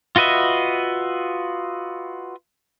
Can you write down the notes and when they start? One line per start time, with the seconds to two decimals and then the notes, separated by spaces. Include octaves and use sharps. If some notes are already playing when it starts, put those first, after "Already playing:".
0.16 F4 F#4 B4 D#5 E5